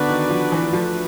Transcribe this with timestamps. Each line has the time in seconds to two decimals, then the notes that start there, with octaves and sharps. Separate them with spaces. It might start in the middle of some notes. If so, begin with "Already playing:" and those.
Already playing: D3 B3 D4 F#4 B4 D5
0.09 D#3
0.30 F3
0.52 E3
0.72 F3 A3 D4 F#4 B4